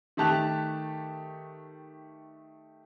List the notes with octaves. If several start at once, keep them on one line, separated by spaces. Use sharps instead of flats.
D#3 A3 G4 A5 F#6 F7